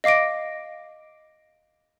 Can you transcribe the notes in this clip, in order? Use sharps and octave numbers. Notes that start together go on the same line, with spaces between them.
D#5 F5 D6 A#6 D7